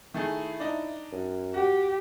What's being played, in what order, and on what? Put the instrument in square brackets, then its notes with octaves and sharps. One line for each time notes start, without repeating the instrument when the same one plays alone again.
[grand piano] D#3 A3 G#4 [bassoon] E4
[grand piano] D4 D#4
[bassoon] F#2
[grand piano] F#4 [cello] G4